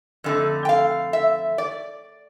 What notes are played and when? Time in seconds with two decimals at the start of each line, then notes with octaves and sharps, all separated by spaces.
0.24 F2 D3 A3
0.65 G5
0.69 F5
1.13 E5
1.58 D5